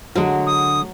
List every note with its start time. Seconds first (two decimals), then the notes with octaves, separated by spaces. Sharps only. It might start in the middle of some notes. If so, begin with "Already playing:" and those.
0.15 D3 F#3 G#3
0.46 D#6